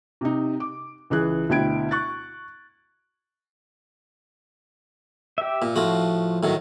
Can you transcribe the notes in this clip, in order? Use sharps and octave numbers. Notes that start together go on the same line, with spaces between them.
C3 D#4
D6
C#2 E3 G#4 F#6
D2 B2 E4 G5 G#6 D7
C#6 F#6 A6
G4 E5
A#2
A2 F3 F4 F#4
A2 D#3 F#3